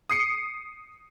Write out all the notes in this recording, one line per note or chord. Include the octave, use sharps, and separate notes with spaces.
D#6 C7 C#7